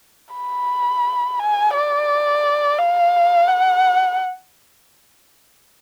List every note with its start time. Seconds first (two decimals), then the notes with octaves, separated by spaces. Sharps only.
0.34 B5
1.39 G#5
1.74 D5
2.78 F5
3.48 F#5